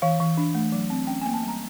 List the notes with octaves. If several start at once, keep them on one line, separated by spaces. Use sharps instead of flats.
E3 F5
E3
D4
A3
F#3
C4
C#4 G5
A#3 G#5
A5
G3
A#5